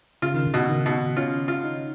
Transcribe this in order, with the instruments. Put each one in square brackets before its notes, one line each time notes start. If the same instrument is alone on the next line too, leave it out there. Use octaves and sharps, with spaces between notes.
[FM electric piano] C#3 [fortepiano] F4
[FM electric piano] D#3
C#3
[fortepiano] B2
[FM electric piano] D#3
[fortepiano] B2
[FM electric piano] C#4 [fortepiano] F4
[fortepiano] F4
[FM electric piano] D#4